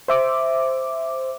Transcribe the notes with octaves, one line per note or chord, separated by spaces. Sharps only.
C5 E5 D6